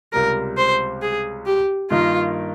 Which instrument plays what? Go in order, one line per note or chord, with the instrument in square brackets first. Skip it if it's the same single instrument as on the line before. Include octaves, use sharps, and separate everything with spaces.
[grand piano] C#2 C3 G3 [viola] A#4
[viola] C5
G#4
G4
[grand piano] G2 D#3 A#3 D#4 A#4 [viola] F4